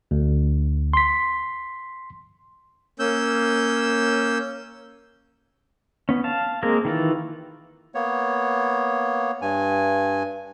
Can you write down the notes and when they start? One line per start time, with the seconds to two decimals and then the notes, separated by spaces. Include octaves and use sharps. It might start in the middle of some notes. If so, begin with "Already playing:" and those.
0.11 D2
0.93 C6 B6
2.99 A#3 C#4 E6 G6
6.09 B3 C#4
6.24 F5 A5
6.63 G#3 A#3 C4 G#4 A#4
6.85 D#3 E3 F4
7.95 A#3 B3 C#5
9.42 G2 G#5